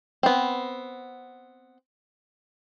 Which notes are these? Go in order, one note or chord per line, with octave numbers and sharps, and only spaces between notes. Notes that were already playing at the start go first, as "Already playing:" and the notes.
B3 C4